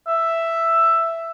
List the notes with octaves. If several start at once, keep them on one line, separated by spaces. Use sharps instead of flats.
E5